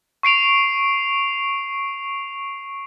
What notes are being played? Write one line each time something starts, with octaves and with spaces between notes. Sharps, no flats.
C#6 C7 D7 F7